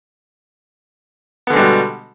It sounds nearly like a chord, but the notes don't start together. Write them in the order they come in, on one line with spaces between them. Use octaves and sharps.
B3 D3 G#3 G3 B2